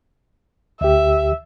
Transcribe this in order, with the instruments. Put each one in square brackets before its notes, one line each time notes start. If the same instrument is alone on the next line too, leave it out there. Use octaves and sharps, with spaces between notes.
[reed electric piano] D2 G4 [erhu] E5